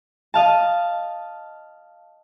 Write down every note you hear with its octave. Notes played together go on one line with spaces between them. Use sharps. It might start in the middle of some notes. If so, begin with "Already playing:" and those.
D#5 F5 A5